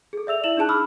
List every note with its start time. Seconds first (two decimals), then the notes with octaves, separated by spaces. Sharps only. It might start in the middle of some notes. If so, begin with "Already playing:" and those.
0.13 G#4 A4
0.27 D5 E5 E6 F7
0.44 E4 E5 E7 F#7
0.57 D4 D#4 G#4 A5 F#6
0.69 B5 D6 E6 F6